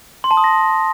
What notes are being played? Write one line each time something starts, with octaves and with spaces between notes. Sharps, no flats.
C6
A5
D#6
A#6